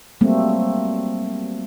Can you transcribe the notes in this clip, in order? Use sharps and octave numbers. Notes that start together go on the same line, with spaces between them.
F#3 G3 A3 A#3 C4